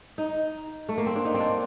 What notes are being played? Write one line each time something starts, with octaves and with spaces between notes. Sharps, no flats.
D#4
A3
A#3
C4
D4
D#4
C4
D4